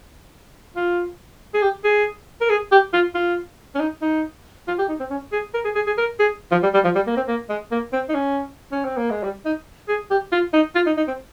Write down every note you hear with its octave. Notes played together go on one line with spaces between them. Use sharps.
F4
G#4
G4
G#4
A#4
G#4
G4
F4
F4
C#4
D#4
D#4
F4
G4
D#4
C4
C#4
G#4
A#4
G#4
G#4
G#4
A#4
G#4
F3
G3
G3
F3
G3
A#3
C4
A#3
G#3
A#3
C4
D#4
C#4
C#4
C4
A#3
G#3
G3
D#4
G#4
G4
F4
D#4
F4
D#4
D#4
C4